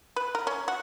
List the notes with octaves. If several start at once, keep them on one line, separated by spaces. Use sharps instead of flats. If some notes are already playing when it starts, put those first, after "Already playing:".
B4
A#4
C#4
F#4